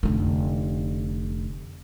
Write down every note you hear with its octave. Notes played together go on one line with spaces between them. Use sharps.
F1 D3